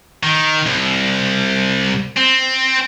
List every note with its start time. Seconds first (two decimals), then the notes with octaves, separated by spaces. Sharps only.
0.23 D#3
0.66 C2
2.17 C4